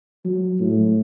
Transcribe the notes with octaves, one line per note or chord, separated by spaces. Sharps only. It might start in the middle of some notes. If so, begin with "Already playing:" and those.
F#3
A2